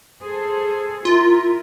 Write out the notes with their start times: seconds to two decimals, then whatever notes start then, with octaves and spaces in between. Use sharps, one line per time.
0.22 G#4 A4 C5
1.05 E4 F4 A#4